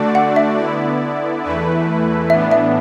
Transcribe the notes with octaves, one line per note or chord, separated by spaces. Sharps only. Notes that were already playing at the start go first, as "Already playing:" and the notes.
Already playing: D3 A3 D4 F#4 D5
F#5
E5
D3 B3 E4 D5
E2 E3 A3 E4 B4
A2 E3 B3 D4 E5
E5